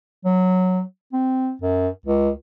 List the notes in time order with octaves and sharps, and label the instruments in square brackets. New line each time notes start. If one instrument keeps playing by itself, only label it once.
[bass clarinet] F#3
C4
F#2
C#2